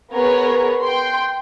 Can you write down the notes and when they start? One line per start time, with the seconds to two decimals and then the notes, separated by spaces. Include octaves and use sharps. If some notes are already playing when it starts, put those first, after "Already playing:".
0.13 B3 G#4 A#4 B4 C#5
0.82 G5 C6